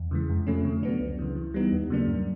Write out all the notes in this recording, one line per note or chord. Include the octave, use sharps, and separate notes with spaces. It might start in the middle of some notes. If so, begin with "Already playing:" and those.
Already playing: E2
C#3 E3 G#3
F2
C3 F3 A3 C#4
D3
F#3 B3 D4
C#2
C#3 E3
E3
G3 B3 D#4
D#2
C#3 F#3 A#3 D4
G2